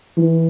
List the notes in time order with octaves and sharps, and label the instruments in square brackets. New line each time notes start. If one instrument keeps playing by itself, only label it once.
[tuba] E3